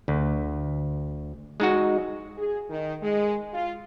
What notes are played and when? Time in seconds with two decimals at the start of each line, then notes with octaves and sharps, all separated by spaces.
0.08 D2
1.60 G#3 D#4 F#4
2.38 G#4
2.70 D#3
3.02 G#3
3.54 F4